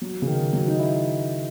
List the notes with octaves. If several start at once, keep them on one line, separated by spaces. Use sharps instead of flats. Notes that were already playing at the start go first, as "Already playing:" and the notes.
F#3
C#3
D#3
F#3
D#4
E4